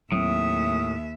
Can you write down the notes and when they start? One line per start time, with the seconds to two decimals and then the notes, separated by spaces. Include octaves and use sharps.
0.12 D#2 A2 F#3 C4 E5 D#6